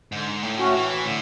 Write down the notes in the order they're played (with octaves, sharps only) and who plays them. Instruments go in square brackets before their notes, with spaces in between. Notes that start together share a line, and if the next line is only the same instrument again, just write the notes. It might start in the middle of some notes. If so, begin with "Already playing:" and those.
[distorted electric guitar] G#2 [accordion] D3
[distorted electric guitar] A2
[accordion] A3 C#4 F#4
[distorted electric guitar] E3
[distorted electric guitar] A2 [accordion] D3